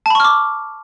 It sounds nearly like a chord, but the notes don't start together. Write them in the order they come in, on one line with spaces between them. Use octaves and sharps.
A5 B5 C#6 F6 D6